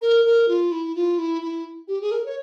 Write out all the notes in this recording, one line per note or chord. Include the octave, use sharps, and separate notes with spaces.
A#4
A#4
F4
E4
F4
E4
E4
G4
G#4
A#4
C#5